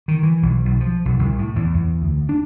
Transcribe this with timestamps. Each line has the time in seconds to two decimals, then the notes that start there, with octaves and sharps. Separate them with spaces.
0.08 D#3
0.23 E3
0.42 B1
0.65 B1
0.81 F3
1.05 B1
1.19 C2
1.38 A2
1.56 E2
1.74 E2
2.02 D2
2.29 D4